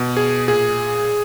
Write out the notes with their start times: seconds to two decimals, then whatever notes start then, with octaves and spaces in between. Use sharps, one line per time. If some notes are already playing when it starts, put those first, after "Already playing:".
Already playing: B2
0.17 G#4
0.48 A#2 G#4